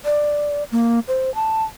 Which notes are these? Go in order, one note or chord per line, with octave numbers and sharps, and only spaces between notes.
D5
A#3
C5
A5